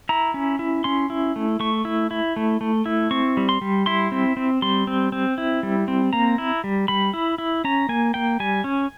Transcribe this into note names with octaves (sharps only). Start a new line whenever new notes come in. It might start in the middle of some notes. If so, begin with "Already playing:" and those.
E4 A#5
C#4
E4
C#4 C6
E4
A3
A3 C#6
E4
E4
A3
A3
E4
C4 C#6
G3
C6
G3
E4 C6
C4
C4
G3 C6
C4
C4
E4
G3
C4
A#3 A#5
E4
G3
G3 B5
E4
E4
C#4 A#5
A#3 G#5
A#3 G5
G3 G#5
C#4